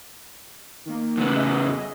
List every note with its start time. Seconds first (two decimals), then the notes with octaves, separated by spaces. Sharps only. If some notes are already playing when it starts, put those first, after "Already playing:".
0.85 D#3 A#3
1.17 E2 C#3 B3
1.34 G#4 D#5 E5